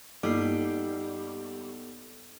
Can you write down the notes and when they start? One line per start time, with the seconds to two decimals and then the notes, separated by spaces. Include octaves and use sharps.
0.23 G2 G3 A#3 B3 D#4 A4 C7